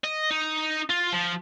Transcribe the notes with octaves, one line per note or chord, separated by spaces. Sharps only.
D#5
D#4
F4
F3